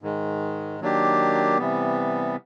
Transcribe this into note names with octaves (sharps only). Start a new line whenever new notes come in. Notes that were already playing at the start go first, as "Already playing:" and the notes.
G#2 D#3 G#3
D#3 F#3 A#3 D4 G4
C3 E3 G3 B3